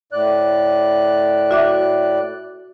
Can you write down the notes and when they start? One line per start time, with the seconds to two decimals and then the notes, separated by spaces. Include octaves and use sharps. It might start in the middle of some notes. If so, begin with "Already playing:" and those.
0.13 A2 D5 F#6
1.51 F#4 E5 D6